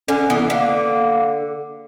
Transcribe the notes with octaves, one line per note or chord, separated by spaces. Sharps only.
D3 C#4
E3 B3
D3 A#3